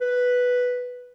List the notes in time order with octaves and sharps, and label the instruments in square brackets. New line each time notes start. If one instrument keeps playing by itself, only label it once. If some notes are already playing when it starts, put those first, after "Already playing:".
[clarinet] B4